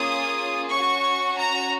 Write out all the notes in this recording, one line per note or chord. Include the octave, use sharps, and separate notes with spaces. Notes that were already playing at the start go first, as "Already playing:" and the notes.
Already playing: A#3 C#4 F4 G#4 D#6
C#4 F#4 C#6
A#5